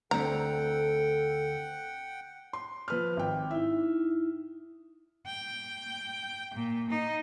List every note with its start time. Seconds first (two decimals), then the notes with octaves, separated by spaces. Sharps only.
0.11 D2 C4 A4 F#5 G5 A#5
2.53 C6
2.88 F3 B4 F6
3.17 G#1 G5
3.51 D#4 E4 E5
5.27 G5
6.54 A#2
6.90 D#4